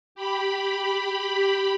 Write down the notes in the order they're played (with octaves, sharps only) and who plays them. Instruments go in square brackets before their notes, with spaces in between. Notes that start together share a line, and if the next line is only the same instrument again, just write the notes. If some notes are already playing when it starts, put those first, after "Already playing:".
[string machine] G4 B5